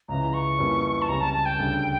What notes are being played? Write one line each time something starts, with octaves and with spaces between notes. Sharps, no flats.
C#2 C#3 E3 A#5
C#6
F2 E3 G3 A#3 C#4
A5
C#2 C#3 G3 C#4 A#5
A5
A5
G5
D2 C#3 G3 D4 A4